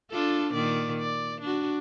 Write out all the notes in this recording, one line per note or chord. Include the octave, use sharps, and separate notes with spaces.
D4 F4 A4
A#2 D#3 D5
D5
D4 F#4